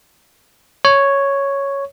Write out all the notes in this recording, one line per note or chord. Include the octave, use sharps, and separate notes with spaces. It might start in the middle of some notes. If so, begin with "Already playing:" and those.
C#5